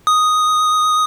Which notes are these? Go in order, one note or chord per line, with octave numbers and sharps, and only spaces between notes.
D#6